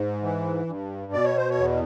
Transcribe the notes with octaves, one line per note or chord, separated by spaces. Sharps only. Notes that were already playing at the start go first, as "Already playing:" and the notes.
Already playing: G#2
E3
G2
B2 D5
C#5
C5
C#5
E2